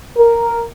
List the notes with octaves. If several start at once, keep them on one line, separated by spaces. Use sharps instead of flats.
A#4